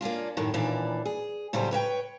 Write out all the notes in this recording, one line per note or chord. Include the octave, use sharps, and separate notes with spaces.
A#3 C#4 D4 F4
F#2 A2 D#3
D#2 A#2 E3 D4
G#4
A2 C#3 F#3 G3 G4 C5
B4 C#5 E5 G5